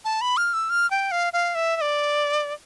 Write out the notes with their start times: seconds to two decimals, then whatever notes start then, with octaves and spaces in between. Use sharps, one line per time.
0.05 A5
0.21 B5
0.37 F6
0.54 E6
0.70 F6
0.91 G5
1.11 F5
1.33 F5
1.55 E5
1.76 E5
1.81 D5